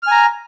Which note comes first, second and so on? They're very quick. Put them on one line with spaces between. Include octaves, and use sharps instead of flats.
F6 G#5 A#5